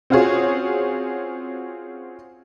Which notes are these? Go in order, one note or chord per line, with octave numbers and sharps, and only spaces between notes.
C4 C#4 F4 F#4 G#4 C#5